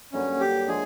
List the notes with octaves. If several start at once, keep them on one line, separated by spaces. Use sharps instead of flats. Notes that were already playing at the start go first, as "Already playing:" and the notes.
G2 D3 F#3 A#3 C#4
G4
D3 F3 G#3 G#4